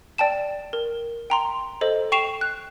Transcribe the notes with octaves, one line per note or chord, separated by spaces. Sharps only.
D5 G5 A5 E7
A#4
G5 A#5 C6
A4 C5 D#5
G5 C#6 C7 E7 F7
F#6